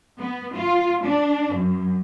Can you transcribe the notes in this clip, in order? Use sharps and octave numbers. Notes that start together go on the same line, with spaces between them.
B3
F4
D4
F#2